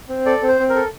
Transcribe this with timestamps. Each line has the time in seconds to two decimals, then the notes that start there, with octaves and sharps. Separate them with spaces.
0.09 C4
0.26 A4 D5
0.42 C4
0.48 C5
0.60 C4
0.70 A#4
0.76 A4